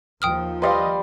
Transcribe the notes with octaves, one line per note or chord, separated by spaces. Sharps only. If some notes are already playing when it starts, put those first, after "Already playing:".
D#2 F3 G5 D#6 F6
G3 B4 D#5 F5 C6